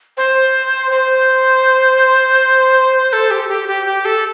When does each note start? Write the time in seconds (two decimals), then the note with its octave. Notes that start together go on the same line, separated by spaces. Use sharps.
0.17 C5
0.91 C5
3.13 A4
3.31 G4
3.49 G4
3.67 G4
3.86 G4
4.05 A4